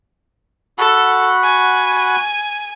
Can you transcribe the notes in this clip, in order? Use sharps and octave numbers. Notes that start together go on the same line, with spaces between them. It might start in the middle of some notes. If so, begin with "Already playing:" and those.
F#4 A4 F#5 B5
G#5